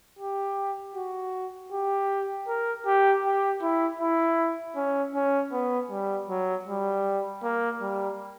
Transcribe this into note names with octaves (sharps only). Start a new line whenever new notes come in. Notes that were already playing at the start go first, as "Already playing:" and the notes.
G4
F#4
G4
A#4
G4
G4
E4
E4
C#4
C#4
B3
G3
F#3
G3
A#3
G3